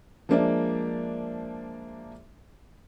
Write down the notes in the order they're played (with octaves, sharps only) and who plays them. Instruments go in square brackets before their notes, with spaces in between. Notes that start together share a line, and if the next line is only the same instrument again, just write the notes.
[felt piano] F3 G#3 A#3 D4 D5 E5